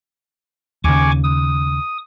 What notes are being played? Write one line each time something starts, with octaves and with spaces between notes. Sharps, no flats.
D#2 C#3 G#5 C#6 D6
D#6